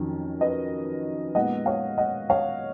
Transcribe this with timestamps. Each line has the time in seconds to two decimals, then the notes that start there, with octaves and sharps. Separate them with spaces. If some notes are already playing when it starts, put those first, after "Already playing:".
Already playing: F2 D#3 F#3 C#4
0.41 B4 D#5
1.35 A#2 G#3 B3 D#4 D#5 F#5
1.66 C#5 F5
1.98 D#5 F#5
2.30 C#5 F5